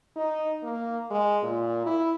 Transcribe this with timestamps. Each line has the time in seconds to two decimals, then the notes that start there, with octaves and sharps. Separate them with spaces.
0.16 D#4
0.63 A#3
1.11 G#3
1.43 A#2
1.86 E4